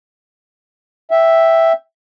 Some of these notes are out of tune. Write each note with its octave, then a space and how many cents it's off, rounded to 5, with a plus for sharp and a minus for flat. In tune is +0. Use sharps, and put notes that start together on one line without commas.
E5 +0 G5 -5